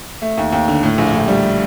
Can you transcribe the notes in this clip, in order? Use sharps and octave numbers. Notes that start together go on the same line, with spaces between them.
A3
D#2
D#2
D3
A2
A#1
A2
G3